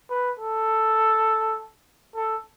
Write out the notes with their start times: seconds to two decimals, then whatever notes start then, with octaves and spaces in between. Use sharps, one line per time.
0.10 B4
0.39 A4
2.15 A4